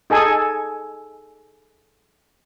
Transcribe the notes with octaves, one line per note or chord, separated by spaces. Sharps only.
D#4 G#4 A4 G#5